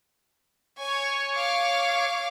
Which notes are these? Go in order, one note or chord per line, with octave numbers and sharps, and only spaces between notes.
C#5 G#5 C#6
F5 D6